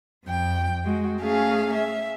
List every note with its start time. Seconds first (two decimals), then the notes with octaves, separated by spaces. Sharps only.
0.24 F2 G5
0.83 G#3 F#4
1.20 A3 C#4 G#4 F5
1.73 E5